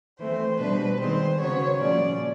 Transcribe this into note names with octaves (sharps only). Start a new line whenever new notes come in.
E3 A3 C4 C5
B2 G3 B3 D4 B4
D#3 G#3 C4 C5
C#3 F#3 B3 C#5
A#2 F3 G#3 C#4 D5